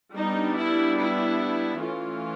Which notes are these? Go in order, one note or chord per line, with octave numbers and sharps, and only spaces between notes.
G3 B3 D4 D#4
E4
E4
E3 A3 C#4 F4